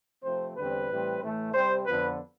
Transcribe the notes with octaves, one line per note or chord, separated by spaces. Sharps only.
C3 F3 A3 C4 C5
E2 D3 G3 C4 B4
A2 E3 G3 C4
A2 E3 A3
C3 G3 C4 C5
F2 D3 F3 B3 B4